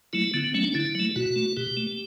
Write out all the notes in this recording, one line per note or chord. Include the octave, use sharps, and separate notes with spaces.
F#3 A3 E4
D3 B3
B3
F#3 A3 C#4
D4
D3 E4
F#3 A3
B2 F#4
A3
B2 G4
A3